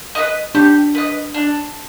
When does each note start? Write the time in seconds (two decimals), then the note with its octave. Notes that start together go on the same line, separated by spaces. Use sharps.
0.15 B4 D#5
0.55 D4 G4
0.95 B4 D#5
1.34 D4